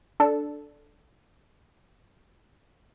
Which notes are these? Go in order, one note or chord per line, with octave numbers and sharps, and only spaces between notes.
D4 A4